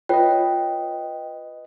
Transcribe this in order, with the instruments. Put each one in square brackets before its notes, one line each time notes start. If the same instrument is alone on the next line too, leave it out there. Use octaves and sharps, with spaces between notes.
[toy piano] F4 C#5 [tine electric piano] B4 D#5 [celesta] G5